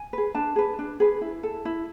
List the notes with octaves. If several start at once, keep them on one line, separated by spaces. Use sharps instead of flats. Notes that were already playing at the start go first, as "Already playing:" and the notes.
Already playing: G#5
G#4 B4
D4 A5
G#4 B4
D4
G#4 B4
E4
A4
E4